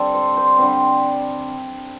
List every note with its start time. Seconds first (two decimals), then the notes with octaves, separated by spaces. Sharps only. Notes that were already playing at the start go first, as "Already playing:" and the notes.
Already playing: D3 G3 C4 A4
0.14 C5
0.37 C5
0.58 D3 G3 C4